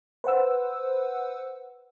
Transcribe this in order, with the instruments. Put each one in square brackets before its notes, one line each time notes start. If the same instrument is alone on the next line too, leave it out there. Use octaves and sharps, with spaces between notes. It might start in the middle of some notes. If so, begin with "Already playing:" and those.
[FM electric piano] B4 C5 F#5 E6